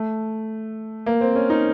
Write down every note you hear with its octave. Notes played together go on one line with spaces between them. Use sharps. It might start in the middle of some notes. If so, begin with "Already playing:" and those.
Already playing: A3
A#3
C4
C#4
D#4